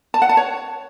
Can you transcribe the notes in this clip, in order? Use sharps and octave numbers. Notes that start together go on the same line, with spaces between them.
A5
F#5
A5
C#5